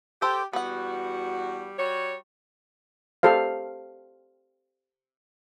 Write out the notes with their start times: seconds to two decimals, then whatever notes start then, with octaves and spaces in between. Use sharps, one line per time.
0.22 G4 A4 C5
0.53 E2 G3 B3 F#4 F#5
1.78 G3 F#4 C#5
3.23 G4 A4 C5 F5